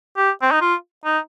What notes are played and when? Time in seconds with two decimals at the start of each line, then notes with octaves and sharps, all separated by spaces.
0.17 G4
0.42 C4
0.52 D#4
0.62 F4
1.05 D#4